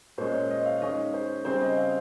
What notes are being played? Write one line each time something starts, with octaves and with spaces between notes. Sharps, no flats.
A#2 G#3 C#4 C5
C#5
D#5
F5
D#3 G#3 C#4 D#5
C5
C#3 G3 C4 C5
D#5
F5